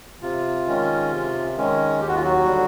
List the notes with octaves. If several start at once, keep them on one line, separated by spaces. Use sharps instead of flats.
C3 F4
D#3 G#3 C#4
C3
D#3 G#3 C#4
D#2 G4
F#4
F4
F#3 F#4
D3 G3